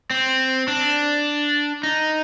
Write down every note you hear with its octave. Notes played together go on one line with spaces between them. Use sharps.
C4
D4
D#4